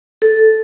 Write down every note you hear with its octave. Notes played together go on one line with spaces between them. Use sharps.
A4